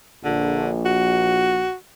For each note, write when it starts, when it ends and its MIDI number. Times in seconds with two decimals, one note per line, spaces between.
0.24 1.67 34
0.24 0.70 50
0.85 1.74 66